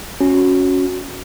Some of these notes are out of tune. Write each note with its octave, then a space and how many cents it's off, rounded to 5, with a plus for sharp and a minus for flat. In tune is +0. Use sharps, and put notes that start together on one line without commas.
C#4 +0 F#4 -15